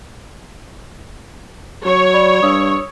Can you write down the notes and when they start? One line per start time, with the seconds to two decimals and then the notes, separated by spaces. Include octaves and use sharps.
1.85 F#3 C#5
2.14 D5 B5
2.42 G2 D#6 E6